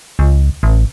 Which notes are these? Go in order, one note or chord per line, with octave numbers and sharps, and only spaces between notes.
C#2
A1